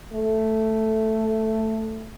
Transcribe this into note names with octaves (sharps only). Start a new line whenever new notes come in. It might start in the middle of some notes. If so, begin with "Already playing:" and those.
A3